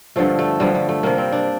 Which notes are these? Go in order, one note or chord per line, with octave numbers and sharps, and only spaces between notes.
G2 D3 F3 A3
A3
G2 D3 F3 G3
G3
A3
C3 G3 A#3
C4
D4